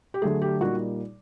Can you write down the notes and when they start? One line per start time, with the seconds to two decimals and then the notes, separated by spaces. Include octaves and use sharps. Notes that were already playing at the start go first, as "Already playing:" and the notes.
0.14 G4
0.22 D3 F#3 A3 G#4
0.42 G4
0.61 A#2 G3 A#3 D#4 F#4